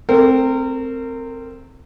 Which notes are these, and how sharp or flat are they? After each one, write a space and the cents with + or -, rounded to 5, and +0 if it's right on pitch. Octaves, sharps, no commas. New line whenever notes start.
A3 +0 C4 +0 A#4 -25